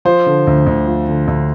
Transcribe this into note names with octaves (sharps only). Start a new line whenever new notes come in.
F3 C5
D3
D2
D2
F3
D3
D2